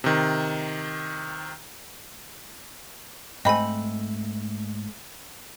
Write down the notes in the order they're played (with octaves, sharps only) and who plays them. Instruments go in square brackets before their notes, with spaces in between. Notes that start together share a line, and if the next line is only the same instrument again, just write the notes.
[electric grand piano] C3 D#3
[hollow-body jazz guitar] G#2 A3 [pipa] C4 B5 [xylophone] D#5 G#5